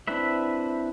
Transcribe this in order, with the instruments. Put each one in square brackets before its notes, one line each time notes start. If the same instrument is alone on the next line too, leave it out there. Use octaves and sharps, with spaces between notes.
[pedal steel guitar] C4 D4 E4 B4 E5